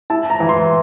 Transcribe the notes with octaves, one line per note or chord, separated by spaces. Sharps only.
E4 A5
A#5
E3
C6